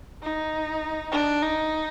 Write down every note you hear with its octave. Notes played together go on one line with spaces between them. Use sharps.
D#4
D4
D#4